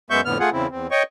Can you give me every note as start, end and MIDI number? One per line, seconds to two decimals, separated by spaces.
0.10 0.21 42
0.10 0.21 56
0.10 0.21 59
0.10 0.21 76
0.10 0.21 85
0.10 0.21 91
0.25 0.38 41
0.25 0.38 45
0.25 0.38 50
0.25 0.38 59
0.25 0.38 89
0.40 0.50 57
0.40 0.50 65
0.40 0.50 68
0.40 0.50 78
0.53 0.67 40
0.53 0.67 49
0.53 0.67 60
0.53 0.67 64
0.71 0.87 40
0.71 0.87 60
0.91 1.03 73
0.91 1.03 75
0.91 1.03 79
0.91 1.03 85